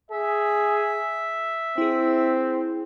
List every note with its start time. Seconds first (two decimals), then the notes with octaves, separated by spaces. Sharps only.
0.11 G#4 E5
1.78 C4 E4 G#4